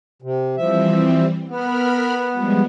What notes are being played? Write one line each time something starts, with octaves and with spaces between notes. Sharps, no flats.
C3
E3 F3 G3 C4 E5
B3 A#4 B5 F6
F3 G3 G#3